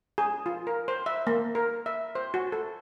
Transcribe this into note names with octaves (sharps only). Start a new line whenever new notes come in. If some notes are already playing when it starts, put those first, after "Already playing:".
G#4
F4
A#4
C5
E5
A#3
A#4
E5
C5
F#4
A4